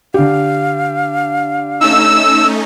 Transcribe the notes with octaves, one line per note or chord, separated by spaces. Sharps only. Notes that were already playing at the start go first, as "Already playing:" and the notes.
D3 G4 F5
A3 C#4 D#4 E6